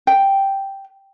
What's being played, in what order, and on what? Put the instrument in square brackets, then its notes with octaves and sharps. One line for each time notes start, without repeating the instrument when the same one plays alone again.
[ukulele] G5